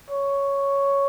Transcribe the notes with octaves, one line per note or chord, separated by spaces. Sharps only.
C#5